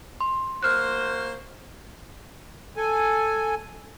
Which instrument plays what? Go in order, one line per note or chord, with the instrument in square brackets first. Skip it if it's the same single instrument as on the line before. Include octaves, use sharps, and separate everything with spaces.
[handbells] C6
[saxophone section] A#3 F#4 C5 [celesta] F6 F#6
[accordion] A4 G#5